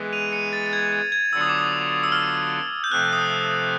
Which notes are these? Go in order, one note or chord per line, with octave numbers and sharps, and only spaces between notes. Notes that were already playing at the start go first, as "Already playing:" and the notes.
Already playing: E3 G#3 B3
D#7 F7
C#7 D#7
A6
A6
G#6
G#6
G#6
D3 F#3 B3 D4 F4 E6
D#6
D6
D#6
E6
F6
G6
C3 F3 A3 C4 F#6
D#6
E6
D#6